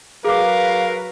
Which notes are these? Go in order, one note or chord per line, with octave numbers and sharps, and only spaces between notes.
F#3 G#4 A#4 B4 F5 D6